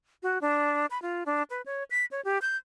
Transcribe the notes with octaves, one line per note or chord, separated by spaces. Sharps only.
F#4
D4
B5
F4
D4
B4
C#5
B6
C#5
G4
G6